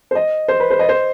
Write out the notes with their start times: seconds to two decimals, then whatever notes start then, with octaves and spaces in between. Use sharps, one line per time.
0.11 C5
0.15 D#5
0.48 C5
0.60 B4
0.70 C5
0.79 D#5
0.89 C5